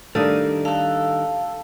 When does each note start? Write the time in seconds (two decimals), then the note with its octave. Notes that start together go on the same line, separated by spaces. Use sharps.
0.15 D#3 G3 A3 D4 D5 F5 D#6
0.65 A4 F5 F#6